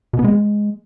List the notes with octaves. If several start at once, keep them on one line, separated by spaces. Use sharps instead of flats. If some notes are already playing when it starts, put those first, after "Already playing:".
B2
B3
G#3